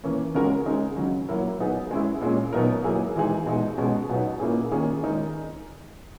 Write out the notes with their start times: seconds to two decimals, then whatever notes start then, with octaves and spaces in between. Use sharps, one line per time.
0.04 E3 A#3 C#4
0.34 C#3 G#3 C#4 F#4 A#4
0.66 C#3 G#3 D#4 G#4
0.96 C#3 F#3 C#4
1.29 F#3 A#3 E4 A#4
1.59 F#3 B3 D#4 G#4
1.91 G#3 C#4 E4
2.21 A#2 G#3 C#4
2.53 B2 F#3 B3 D#4 A#4
2.84 F#3 A#3 E4 G#4
3.16 E3 G#3 D#4 G#4
3.46 B2 G#3 D#4
3.78 B2 G#3 C#4 G#4
4.09 B2 F#3 B3 D#4
4.40 A#2 A#3 C#4 E4 G#4
4.71 D#3 A#3 C#4 G#4
5.03 D#3 G#3 D#4 A#4